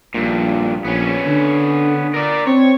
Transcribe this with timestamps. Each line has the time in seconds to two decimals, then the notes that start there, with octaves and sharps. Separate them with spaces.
0.14 A#1 G2 A#2
0.85 A#1 B3 C#4
1.27 D3
2.14 A#4 D5
2.47 C4 C#5